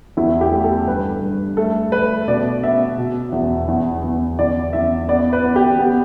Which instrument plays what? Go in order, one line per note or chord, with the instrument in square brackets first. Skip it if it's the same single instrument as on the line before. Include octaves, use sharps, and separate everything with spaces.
[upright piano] E2 E4
G4
A3
A4
G2 B4
G2
A3 A4
A3 B4
B2 D5
B3 E5
B2
E2
E2
E2
E2 D5
E2 E5
B3 D5
B4
B3
G4
B3